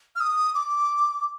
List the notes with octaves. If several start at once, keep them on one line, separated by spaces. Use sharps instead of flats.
F6
D#6
D6